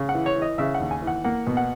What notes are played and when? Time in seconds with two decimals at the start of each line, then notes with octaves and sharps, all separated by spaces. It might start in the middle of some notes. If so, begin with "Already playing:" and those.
Already playing: C#3
0.09 F#5
0.15 E3
0.26 C#5
0.36 E3
0.42 D#5
0.58 C#3 E5
0.74 F#5
0.80 D#2
0.91 G#5
1.02 E3
1.07 F#5
1.24 A#3 F#5
1.47 B2
1.57 F#5